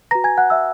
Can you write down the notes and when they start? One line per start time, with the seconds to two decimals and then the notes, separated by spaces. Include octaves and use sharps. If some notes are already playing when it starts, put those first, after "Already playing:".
0.11 F#4 B4 A#5 A#6
0.24 G#5 G#6
0.38 F#5 F#6
0.50 E5 E6